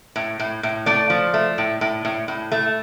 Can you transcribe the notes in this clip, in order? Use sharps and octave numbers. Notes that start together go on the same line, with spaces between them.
A2
A2
A2
A3 D5
F3
A3
A2
A2
A2
A2
A3